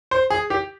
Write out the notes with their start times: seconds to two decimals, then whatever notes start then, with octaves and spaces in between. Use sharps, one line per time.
0.11 C5
0.30 G#4
0.50 G4